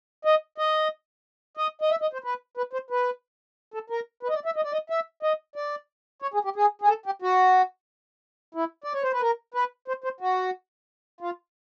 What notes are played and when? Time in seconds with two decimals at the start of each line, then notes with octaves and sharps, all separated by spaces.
0.25 D#5
0.58 D#5
1.57 D#5
1.81 D#5
1.91 E5
2.02 D#5
2.13 C5
2.24 B4
2.57 B4
2.73 C5
2.90 B4
3.74 A4
3.90 A#4
4.23 B4
4.29 D#5
4.35 D5
4.45 E5
4.56 D#5
4.64 D5
4.73 D#5
4.90 E5
5.23 D#5
5.56 D5
6.22 C#5
6.34 G#4
6.45 G4
6.56 G#4
6.82 G#4
6.88 A4
7.06 G4
7.22 F#4
8.55 E4
8.84 D5
8.94 C#5
9.03 C5
9.12 B4
9.21 A#4
9.54 B4
9.88 C5
10.04 C5
10.20 F#4
11.21 F4